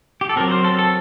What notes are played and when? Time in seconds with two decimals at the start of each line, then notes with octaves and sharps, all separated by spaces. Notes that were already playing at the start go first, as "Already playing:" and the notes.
0.21 G4
0.29 A4
0.36 F#3 C4 A#4
0.51 C5
0.65 A4
0.79 A4